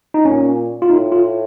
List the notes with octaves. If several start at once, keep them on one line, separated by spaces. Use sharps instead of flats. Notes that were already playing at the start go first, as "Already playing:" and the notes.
D#4
A#2 C#4
F4
A2 D#4
F4